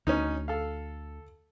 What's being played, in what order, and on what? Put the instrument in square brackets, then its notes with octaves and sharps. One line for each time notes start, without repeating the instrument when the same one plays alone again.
[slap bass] D2 [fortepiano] C#4 D#4
[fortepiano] A4 F5